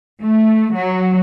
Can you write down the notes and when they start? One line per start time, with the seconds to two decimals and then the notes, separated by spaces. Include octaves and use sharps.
0.21 A3
0.74 F#3